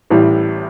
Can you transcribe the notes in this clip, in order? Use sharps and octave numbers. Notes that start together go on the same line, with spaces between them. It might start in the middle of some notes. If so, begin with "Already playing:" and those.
A1 A2 G3